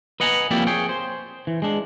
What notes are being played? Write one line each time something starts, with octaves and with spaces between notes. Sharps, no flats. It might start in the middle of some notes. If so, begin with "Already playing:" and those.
B4 D#5 F#5 G#5 A#5
F3 A#3 C4 E4 G4 D5
G#4 C#5 G5
C5
E3
G#3 D4